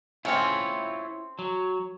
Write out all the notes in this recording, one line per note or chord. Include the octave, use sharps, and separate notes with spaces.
C#3 C4 E4 F4 C#5
F#3